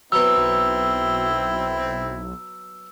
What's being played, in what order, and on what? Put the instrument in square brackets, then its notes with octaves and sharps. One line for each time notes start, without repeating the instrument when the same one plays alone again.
[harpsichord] F#3 B3 [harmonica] C4 E4 [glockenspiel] E6
[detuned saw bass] B1